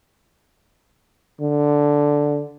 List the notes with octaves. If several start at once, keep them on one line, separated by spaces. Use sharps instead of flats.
D3